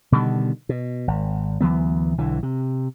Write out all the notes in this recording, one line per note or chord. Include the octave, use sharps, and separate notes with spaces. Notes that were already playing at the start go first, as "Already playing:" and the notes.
B2 D3 D#3 G3
B2
G#1
D2 E3 F#3 B3
B1 D3 E3
C3